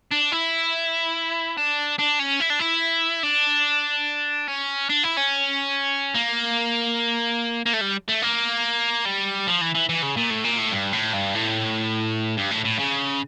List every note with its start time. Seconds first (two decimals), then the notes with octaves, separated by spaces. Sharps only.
0.12 D4
0.32 E4
1.57 D4
1.99 D4
2.19 C#4
2.40 E4
2.50 D4
2.60 E4
3.23 D4
4.48 C#4
4.90 D4
5.04 E4
5.17 C#4
6.14 A#3
7.66 A#3
7.73 A3
7.81 G3
8.09 A3
8.22 A#3
9.05 G3
9.47 F3
9.61 E3
9.75 E3
9.89 E3
10.02 C#3
10.17 A#2
10.30 A2
10.44 A#2
10.58 A2
10.72 G2
10.93 A2
11.13 G2
11.35 A2
12.38 G2
12.52 A2
12.66 A2
12.80 C#3